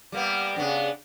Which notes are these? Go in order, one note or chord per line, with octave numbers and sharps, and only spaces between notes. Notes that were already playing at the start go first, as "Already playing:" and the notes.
G3 A#3 B3
C#3 B3 D4